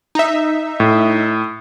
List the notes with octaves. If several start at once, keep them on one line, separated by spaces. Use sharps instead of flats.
D#4 E5
A2